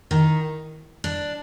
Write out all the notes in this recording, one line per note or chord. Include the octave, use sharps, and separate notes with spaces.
D#3
D4